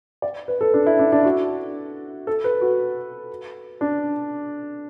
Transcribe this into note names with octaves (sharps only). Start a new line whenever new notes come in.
D5
B4
A4
D4
E4
D4
D4
F#4
A4
B4
F#4
D4